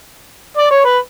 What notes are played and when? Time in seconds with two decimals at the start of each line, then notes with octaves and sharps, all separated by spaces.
0.57 D5
0.71 C#5
0.85 B4